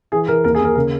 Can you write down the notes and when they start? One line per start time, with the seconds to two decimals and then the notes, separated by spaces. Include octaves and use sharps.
0.12 E3 G#4
0.28 E3 A#4
0.44 D#2 A#4
0.55 G#4
0.61 D#2 A#4
0.75 C#3 A#4